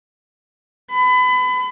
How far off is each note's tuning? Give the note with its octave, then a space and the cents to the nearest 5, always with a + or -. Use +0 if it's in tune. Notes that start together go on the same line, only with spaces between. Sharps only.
B5 +30